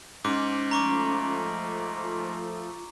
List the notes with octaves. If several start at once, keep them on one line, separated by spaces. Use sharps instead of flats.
G#2 C#4 D6
F3 A3 A#5 C#6 D6
F4